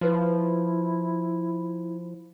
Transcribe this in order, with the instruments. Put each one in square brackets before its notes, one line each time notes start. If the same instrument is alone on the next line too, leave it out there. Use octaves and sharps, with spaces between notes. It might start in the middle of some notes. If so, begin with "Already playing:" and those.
[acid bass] F3 [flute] E4 [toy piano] F4 B4 C5